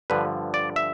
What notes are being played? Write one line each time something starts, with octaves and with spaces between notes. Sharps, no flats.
G2 D3 F3 B4
D5
E5